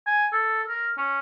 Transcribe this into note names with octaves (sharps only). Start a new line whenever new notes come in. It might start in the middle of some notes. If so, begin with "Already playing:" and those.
G#5
A4
A#4
C#4